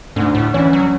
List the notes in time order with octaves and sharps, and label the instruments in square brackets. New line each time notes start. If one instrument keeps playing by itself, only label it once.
[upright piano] D2 [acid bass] G#2
[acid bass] A2
[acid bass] E3 [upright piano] C#4
[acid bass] F#3